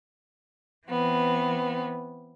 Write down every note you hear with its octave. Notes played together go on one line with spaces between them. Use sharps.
E3 B3 C4